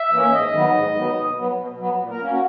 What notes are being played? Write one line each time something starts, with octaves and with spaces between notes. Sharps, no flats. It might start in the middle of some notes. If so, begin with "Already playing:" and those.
Already playing: E5
E3 A#3 C#4
G#2 D#5
D#3 F#3 B3
G#2
D#3 F#3 B3
B2
F#3 B3
B2
F#3 B3
A#2
A#4
A#3 C#4
F#4